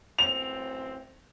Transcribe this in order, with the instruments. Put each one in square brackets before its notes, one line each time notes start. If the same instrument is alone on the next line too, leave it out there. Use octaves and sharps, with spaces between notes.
[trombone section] A1 F#2 C4 [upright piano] F7